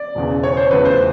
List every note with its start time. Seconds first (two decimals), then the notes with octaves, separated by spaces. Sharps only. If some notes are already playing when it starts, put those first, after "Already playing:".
Already playing: D5
0.15 E1 E2 C#3
0.44 C#5
0.57 C5
0.71 F1 E2 C#3 B4
0.85 C5